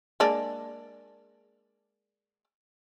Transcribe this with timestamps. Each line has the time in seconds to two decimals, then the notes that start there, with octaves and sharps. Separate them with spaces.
0.20 G#3 A#3 D4